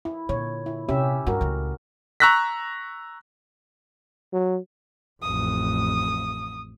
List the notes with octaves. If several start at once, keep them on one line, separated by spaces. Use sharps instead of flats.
E4
A#2 D3 C#5
E4
C3 C#4 G4 E5
G2 F#4 A#4
C#2 A3
A#5 C#6 E6 F#6 A#6 B6
F#3
A1 F2 D#6